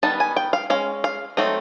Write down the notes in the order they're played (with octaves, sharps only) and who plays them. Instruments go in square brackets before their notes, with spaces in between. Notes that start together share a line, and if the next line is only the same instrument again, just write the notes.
[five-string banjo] D#3 G3 B3 D#4 A5
G#5
G5
F5
G#3 C#4 F5
F5
F#3 A3 C4 D#4